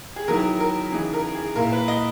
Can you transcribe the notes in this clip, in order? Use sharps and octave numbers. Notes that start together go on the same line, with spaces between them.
G#4
D#3 F#3 B3 E4 A#4
A#4
C#3 E3 B3 D#4 G#4
A#4
G#4
A#2 A#3 E4 A#4
B4
D#5